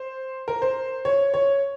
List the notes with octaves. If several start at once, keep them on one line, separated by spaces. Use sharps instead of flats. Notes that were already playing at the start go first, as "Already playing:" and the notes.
Already playing: C5
A#4
C5
C#5
C#5